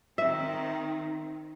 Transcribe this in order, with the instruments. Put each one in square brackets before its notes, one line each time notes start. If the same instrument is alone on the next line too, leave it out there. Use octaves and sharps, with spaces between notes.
[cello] D#3 C4 [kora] E5